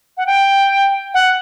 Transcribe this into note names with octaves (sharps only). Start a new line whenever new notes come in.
F#5
G5
F#5